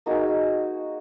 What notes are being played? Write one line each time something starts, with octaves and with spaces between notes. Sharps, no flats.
A#3 D#4 F#4 G#4